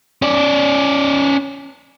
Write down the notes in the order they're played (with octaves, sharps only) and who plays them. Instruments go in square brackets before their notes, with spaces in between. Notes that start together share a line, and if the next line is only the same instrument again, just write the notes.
[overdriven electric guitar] C#4 D5